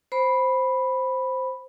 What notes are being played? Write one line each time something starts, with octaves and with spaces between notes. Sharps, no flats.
C5 B5